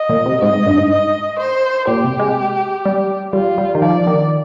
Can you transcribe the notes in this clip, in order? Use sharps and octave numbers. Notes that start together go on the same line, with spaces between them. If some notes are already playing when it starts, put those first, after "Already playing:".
Already playing: D#5
A#2
C3
G#2 D#5
G#2
G2
G#2
D#5
C5
A#2 G4
C3
G#3
G3
G3 F4
G3
D#3
F3 D5
D#3